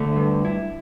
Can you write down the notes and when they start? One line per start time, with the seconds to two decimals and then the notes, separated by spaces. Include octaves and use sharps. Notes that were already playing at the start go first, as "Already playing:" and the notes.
Already playing: D2 D3 A3
0.16 G2
0.45 E4